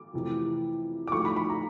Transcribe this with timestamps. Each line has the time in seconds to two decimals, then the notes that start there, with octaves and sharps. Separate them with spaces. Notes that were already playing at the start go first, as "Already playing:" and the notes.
Already playing: D6
0.14 F2 C3 E3 A3
1.07 D6
1.12 G#2 F3 A3 C#6
1.25 B5
1.36 B5
1.50 A#5